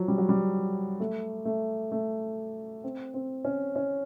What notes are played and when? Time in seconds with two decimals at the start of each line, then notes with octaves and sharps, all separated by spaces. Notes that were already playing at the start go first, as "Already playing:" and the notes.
Already playing: F3 F#3
0.08 G3
0.18 F#3
0.29 G3
1.00 A3
1.45 A3
1.92 A3
2.84 C4
3.14 C4
3.45 C#4
3.76 C#4